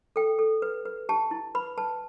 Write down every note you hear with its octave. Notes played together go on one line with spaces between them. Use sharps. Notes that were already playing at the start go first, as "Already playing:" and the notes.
A4 G5
A4
B4
B4
G4 A5
E4
B4 B5
B4 A5